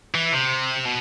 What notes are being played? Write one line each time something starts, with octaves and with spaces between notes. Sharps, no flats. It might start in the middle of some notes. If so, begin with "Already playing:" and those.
E3
C3
B2